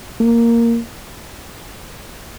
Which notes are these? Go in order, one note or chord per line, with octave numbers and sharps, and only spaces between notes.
A#3